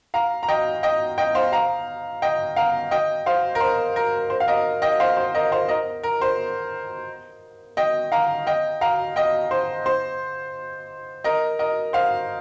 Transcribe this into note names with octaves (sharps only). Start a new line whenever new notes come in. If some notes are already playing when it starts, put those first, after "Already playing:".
F5 A#5
A#5
D#5 G5
D#5 G5
D#5 G5
C5 F5
F5 A#5
D#5 G5
F5 A#5
D#5 G5
C5 F5
A#4
C5
A#4
C5
F5
A#4 D#5
D#5 G5
C5 F5
C5
A#4 D#5
C5 F5
A#4 D#5
A#4
C5
D#5 G5
F5 A#5
D#5 G5
F5 A#5
D#5 G5
C5
C5
A#4 D#5
A#4 D#5
C5 F5